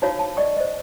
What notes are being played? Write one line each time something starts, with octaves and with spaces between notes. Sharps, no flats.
D#4 E4 F#4 C5 C#5 F5
A5
D5 D#5 G5 C#6
C5 D#5